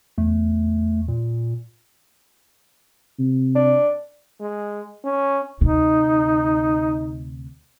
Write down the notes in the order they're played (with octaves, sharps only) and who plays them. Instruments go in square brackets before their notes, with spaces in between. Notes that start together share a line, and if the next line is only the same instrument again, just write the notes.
[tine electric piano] E2 [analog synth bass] A3
[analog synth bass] A#2
[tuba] C3
[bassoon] D4
[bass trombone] G#3
C#4
[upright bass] D2 C3 [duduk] D#4